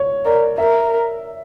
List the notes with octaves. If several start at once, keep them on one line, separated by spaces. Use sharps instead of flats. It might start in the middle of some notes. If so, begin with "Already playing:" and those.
Already playing: C#5
A#4 D5
A#4 E5